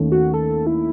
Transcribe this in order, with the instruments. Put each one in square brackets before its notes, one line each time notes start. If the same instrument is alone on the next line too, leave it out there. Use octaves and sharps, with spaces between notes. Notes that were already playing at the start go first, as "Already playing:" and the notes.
Already playing: [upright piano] D#2 D#3 A3 C#4
[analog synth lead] F#4
A4
E4